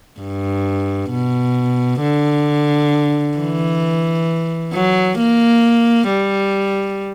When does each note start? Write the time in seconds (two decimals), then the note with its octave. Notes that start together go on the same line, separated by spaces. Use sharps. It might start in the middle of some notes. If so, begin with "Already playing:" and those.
0.20 G2
1.10 B2
2.01 D3
3.37 E3
4.73 F#3
5.18 A#3
6.08 G3